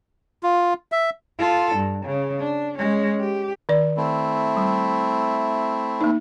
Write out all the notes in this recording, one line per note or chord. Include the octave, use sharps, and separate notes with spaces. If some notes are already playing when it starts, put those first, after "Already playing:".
F4
E5
F4 A4
G2
C#3
D4
G#3 C#4
G4
D#3 D5
A3 C4 E4
G3
A#3 D#4